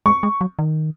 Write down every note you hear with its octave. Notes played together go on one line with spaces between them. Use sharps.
G#3 C#6
G#3
F#3
D#3